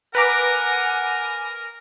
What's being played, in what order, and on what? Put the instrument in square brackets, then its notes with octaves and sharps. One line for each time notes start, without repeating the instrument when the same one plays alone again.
[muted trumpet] A#4 [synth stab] B4 A#5 D6 [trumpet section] F#5 [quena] G#5